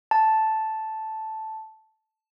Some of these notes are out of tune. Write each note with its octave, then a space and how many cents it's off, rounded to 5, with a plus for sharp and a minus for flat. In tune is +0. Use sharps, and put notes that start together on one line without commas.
A5 -5